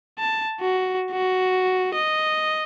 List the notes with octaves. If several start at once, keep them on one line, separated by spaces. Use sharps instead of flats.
A5
F#4
F#4
D#5